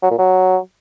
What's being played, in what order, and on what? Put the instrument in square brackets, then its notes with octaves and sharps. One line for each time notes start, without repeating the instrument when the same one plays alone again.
[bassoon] F#3
A#2
F#3